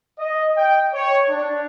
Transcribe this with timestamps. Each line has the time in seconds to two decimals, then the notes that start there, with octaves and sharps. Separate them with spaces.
0.18 D#5
0.57 G5
0.93 C#5
1.29 D4